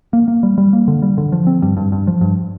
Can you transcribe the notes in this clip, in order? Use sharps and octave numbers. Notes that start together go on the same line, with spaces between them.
A#3
A#3
G3
G3
A#3
D3
G3
D3
F3
C4
G2
G2
G2
F3
G2